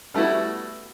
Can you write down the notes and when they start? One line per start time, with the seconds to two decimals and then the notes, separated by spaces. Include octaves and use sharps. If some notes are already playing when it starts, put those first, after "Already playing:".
0.14 G3 A3 B3 E4 F#4